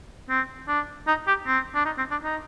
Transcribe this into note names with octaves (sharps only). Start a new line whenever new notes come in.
C4
D4
D#4
G4
C4
D4
D#4
C4
D4
D#4